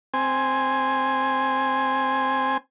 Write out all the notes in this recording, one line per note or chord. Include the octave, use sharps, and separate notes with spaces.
C4 G#5